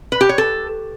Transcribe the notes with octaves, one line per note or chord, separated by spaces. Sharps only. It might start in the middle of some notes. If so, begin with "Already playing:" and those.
B4
G4
C#5
A4